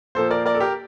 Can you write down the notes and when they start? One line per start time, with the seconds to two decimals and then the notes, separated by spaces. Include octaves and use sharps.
0.15 A#2 F3 A#3 A4 C5
0.30 A#4 D5
0.46 A#4 D5
0.55 A4
0.60 G4 A#4